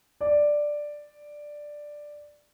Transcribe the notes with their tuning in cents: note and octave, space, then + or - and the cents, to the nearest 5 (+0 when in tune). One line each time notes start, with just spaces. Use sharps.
D5 +5